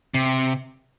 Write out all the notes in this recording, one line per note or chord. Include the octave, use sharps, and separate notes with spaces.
C3